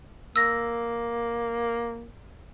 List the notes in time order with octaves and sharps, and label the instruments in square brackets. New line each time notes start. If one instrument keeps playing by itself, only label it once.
[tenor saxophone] A#3 [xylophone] E6 A#6